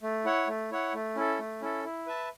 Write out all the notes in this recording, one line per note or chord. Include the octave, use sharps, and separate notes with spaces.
A3
E4 C#5 F#5
A3
E4 C#5 F#5
A3
C#4 E4 A4
A3
C#4 E4 A4
E4
B4 E5 A5